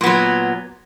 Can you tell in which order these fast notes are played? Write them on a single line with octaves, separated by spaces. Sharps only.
A#2 B3 F#3